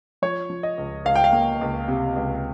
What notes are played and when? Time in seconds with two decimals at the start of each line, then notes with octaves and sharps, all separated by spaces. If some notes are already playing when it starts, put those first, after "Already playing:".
0.22 F3 C#5
0.50 F3
0.63 D#5
0.78 C#2
1.05 C#2 F5
1.16 G5
1.24 F5
1.32 A#3
1.61 C#2
1.88 C3
2.16 C#2